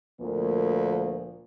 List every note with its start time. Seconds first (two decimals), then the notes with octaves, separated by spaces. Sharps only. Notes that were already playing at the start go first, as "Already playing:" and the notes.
0.21 D2 A#2 F3 A#3